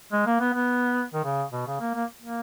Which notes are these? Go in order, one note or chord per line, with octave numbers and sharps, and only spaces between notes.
G#3
A#3
B3
B3
D#3
C#3
B2
C#3
A#3
A#3
A#3